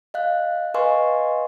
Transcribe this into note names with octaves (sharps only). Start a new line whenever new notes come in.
D#5 F5 F#6
B4 D#5 F5 G#5 C6 C#6